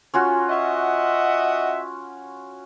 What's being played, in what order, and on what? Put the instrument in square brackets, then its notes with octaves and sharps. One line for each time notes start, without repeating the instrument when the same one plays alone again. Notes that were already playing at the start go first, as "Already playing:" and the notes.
[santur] C#4 F4 F#4
[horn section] D#5 E5 F#5